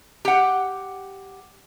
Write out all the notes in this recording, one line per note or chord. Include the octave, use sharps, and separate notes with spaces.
G4 F#5